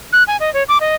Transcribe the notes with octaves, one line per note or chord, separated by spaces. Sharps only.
F#6
G#5
D#5
C#5
D6
D#5